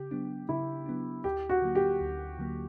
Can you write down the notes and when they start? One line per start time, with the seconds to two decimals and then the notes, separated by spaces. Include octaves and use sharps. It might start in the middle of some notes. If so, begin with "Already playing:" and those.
Already playing: C#3 G4
0.11 F#3 B3 D4
0.49 C#3 E4
0.86 F#3 B3 D4
1.24 D2 G4
1.49 F#4
1.62 D3 F#3 A#3
1.75 G4
2.01 D2
2.39 D3 F#3 A#3